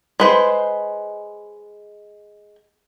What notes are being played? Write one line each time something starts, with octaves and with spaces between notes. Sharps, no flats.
G#3 B4 C5